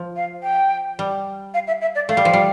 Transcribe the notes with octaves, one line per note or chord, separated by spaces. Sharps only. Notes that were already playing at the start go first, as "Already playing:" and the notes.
Already playing: F3
F5
G5
G3
F5
E5
E5
D5
A3 F5
G3
F3
G3